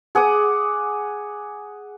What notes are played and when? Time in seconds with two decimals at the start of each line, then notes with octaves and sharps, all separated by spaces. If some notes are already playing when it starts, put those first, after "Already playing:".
0.15 G#4 F#5 D6 D#6